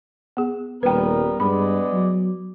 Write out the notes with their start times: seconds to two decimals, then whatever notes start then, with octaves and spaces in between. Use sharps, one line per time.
0.37 B3 G#4
0.83 D#1 G3 B3 A#4 B4 G5
1.40 G2 G#3 B3 D5 B5
1.93 F#3